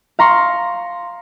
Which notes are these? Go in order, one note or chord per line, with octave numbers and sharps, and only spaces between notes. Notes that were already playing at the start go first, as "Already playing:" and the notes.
F5 A#5 C6 C#6